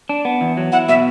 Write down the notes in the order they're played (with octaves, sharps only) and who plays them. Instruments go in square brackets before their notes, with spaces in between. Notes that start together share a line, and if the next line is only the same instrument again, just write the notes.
[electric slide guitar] D4
B3
E2
F#3
[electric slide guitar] E4 [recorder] F#5
[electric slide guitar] B2 [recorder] E5